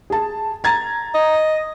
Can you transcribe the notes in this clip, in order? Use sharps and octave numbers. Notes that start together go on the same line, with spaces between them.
G#4 A5
A#5 G#6 A6
D#5